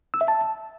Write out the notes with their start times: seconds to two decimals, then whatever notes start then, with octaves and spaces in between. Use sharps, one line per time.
0.14 E6
0.21 E5
0.28 A5